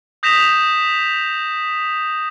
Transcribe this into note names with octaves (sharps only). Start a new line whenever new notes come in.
D#6 G6 A#6 B6 E7 F7